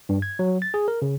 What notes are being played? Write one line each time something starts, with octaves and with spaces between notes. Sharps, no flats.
G2
G#6
F#3
A6
G#4
A#4
C#3